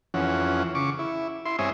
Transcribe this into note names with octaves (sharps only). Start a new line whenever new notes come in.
F2 E3 C#4 F#5
C#3 C#6 D6
E4
E4 C6
G2 C4 C#5 E5 G#5 D#6